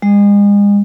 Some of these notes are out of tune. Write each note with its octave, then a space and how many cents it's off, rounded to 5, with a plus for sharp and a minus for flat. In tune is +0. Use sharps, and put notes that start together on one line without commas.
G#3 -40